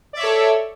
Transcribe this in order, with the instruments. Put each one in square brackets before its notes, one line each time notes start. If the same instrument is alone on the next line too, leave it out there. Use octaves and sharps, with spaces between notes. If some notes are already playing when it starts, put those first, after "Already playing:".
[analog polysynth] D5
E5
C#5
A4